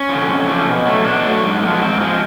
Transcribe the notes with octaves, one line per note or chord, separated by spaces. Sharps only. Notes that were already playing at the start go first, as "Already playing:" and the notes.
Already playing: C#4
D3 F3
F2
D3 F3
B2
F#3 A3
B2 D4
F#3 A3
G#2
F3 G#3 A#3
B3
G#2 C4
F3 G#3